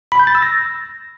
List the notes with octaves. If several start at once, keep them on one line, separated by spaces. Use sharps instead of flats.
B5
G6
A6
E6
A#6